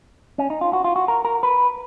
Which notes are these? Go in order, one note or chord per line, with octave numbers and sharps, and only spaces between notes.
C#4
D#4
F4
F#4
F4
F#4
A#4
A#4
B4